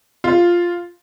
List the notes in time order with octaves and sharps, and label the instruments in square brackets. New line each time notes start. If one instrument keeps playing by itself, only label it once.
[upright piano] F4